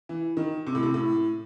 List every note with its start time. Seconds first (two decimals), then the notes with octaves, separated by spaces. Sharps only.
0.09 E3
0.37 D#3
0.67 C3
0.75 A2
0.83 C3
0.94 A2